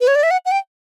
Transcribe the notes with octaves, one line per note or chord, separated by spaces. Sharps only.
B4
C#5
D5
E5
F#5
F#5
G5